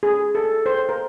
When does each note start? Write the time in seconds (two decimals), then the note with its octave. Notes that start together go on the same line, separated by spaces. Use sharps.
0.03 G#4
0.35 A4
0.66 C5
0.89 A#4